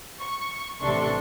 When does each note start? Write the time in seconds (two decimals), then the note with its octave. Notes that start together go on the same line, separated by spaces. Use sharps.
0.19 C#6
0.82 A1 C3 D4 A4 C6 C#6